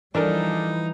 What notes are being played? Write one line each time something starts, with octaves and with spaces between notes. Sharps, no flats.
E3 F3 G3 D4 D#4 A4 A#4